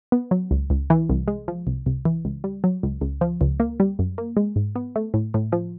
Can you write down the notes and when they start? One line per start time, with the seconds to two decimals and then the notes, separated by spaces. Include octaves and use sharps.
0.12 B3
0.31 F#3
0.51 C#2
0.70 C#2
0.90 E3
1.09 C2
1.28 G#3
1.48 F3
1.67 C2
1.86 C2
2.05 E3
2.25 C#2
2.44 G3
2.64 F#3
2.83 C#2
3.01 C#2
3.21 F3
3.41 C#2
3.60 A#3
3.80 G3
3.99 F#2
4.18 A#3
4.37 G#3
4.56 G#2
4.76 B3
4.96 A3
5.14 A2
5.34 A2
5.52 F3